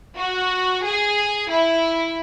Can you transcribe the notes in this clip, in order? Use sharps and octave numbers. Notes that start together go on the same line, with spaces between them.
F#4
G#4
E4